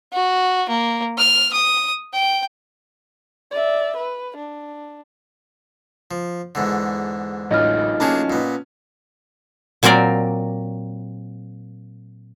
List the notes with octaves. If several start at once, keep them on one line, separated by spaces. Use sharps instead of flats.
F#4
A#3
F6
D#6
G5
D5 E5
B4
D4
F3
E2 G#2 D3
A1 F#3 D#4 F4 D#5 F6
A#3 C#4 D4 G#4 A5
A#2 B3
A#2 F#3 C4 A#4 D5